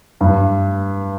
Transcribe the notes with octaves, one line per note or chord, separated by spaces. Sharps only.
G2